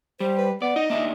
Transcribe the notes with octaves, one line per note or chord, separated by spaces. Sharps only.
G3 C5
B4
B3 D5 F#5
D#4 D#5
A#3 D4 D#4 E5